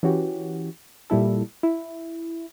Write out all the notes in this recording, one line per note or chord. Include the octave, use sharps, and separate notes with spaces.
E3 C#4 F#4 G4
A#2 G3 E4 A4
E4